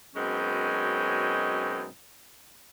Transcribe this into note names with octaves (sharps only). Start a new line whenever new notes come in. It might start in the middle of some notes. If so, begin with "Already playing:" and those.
F#2 B2 G#3 C4 C#4 D#4